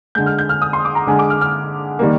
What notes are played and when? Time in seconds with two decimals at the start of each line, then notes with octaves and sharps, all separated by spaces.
0.15 D3 G#3 G6
0.26 F6
0.39 G6
0.49 F6
0.62 D#6
0.73 C6
0.85 D6
0.95 A#5
1.07 D3 G#3 G#5
1.19 D6
1.30 F6
1.41 F6
1.99 D#3 G3 A#3